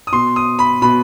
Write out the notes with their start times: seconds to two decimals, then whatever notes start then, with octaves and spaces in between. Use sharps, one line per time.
0.07 D#6
0.12 B2 C6
0.36 D#6
0.59 B5
0.82 B2 B5